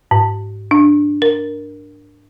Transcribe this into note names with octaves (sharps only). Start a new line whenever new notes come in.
G#2
D4
A#4